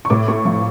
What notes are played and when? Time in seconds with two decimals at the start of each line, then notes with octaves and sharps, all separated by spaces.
0.05 C#6
0.10 A2 D6
0.28 A3 C#6
0.45 F3 C#6